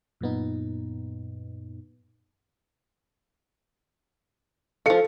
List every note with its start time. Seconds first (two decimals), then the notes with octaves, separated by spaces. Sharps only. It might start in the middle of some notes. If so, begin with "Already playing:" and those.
0.21 F#2 A#2 B3 D#4
4.86 F3 A4 F5 C#7